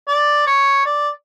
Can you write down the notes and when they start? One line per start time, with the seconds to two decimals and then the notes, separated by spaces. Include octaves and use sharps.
0.08 D5
0.47 C#5
0.86 D5